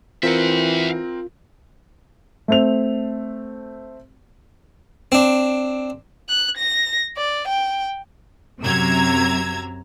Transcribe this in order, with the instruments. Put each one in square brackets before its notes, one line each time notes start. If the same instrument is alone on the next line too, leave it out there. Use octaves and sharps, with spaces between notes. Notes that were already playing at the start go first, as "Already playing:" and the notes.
[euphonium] E3 [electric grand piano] C4 A#4 [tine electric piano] F4 [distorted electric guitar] E5 F#5
[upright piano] A3 C4 F7
[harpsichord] C4 D4
[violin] F#6
A#6
D5
G5
[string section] F#2 C3 F#3 A#5 E6 G#6